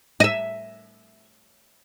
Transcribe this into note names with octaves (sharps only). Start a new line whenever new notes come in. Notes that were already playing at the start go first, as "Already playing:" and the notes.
D#5 E5